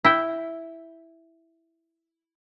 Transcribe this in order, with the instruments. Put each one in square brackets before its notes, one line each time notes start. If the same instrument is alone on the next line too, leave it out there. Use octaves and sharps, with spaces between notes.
[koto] E4 G5